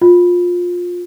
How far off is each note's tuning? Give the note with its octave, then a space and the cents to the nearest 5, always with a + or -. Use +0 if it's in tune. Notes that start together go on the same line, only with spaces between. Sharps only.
F4 +20